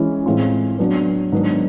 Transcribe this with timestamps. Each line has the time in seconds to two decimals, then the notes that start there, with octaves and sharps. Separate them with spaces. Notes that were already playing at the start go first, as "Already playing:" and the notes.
Already playing: E3 G#3 C#4 E4
0.26 A2 E3 G#3 C4 F4
0.79 F#3 B3 D4 F#4
1.32 G#2 D#3 F#3 B3 D4